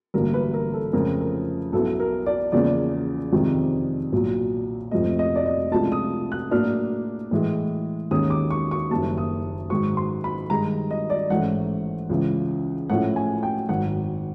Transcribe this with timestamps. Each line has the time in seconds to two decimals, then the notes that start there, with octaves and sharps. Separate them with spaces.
0.14 A1 G2 D3 F#3 A#3 A#4
0.34 B4
0.54 A#4
0.73 A4
0.93 F2 C#3 F3 A3 A#4
1.20 A#4
1.73 B1 B2 F#3 B3 E4 A4
2.00 A#4
2.26 D5
2.52 E2 C#3 F3 A#3 D5
3.32 F2 C3 D#3 G#3
4.12 B1 A#2 F#3
4.91 F1 F2 C3 F3 A3 D#5
5.19 D#5
5.35 D5
5.46 D#5
5.71 C#2 C3 F3 A3 D4 A5
5.92 D#6
6.32 F#6
6.51 A2 F#3 A#3 D4 F6
7.31 A2 E3 G#3
8.11 D#2 D#3 G#3 C#4 D#6
8.30 D6
8.51 C#6
8.71 C#6
8.91 F#1 F#2 D#3 G3 A#3 A5
9.18 D#6
9.70 G#2 D#3 F#3 C#6
9.97 C6
10.24 B5
10.50 G2 D#3 G#3 A#5
10.91 D#5
11.10 D5
11.30 A1 G#2 E3 A3 C#4 F#5
12.09 C#2 C#3 E3
12.90 A2 F3 A3 C#4 E4 F#5
13.16 G#5
13.43 G5
13.69 G#1 F#2 D#3 F#5